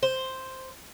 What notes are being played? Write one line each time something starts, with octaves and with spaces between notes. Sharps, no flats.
C5